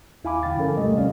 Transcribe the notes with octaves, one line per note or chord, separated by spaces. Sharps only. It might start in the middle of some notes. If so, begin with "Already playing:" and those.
D#2 E4 F5 G#5 B5 D6
E2 D3 F5 G5 A6
G2 F3 C#4 A4 A#4
C3 G3 A3 D#5
D2 G3 C#4 D5 F5